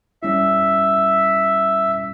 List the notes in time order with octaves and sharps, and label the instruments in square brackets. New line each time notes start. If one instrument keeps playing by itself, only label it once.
[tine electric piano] G3 C#4 E4 [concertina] E5